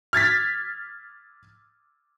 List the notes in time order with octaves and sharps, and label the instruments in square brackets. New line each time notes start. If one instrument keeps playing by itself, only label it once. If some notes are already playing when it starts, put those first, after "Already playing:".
[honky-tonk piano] F6 G#6 A6 B6